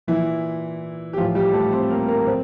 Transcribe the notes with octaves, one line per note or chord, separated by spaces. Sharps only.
A#2 E3 E4
G4
A2 E3 F3 F4
G3 G4
A3 A4
C4 C5
A#3 A#4
A#3 A#4
A#2 C4 C5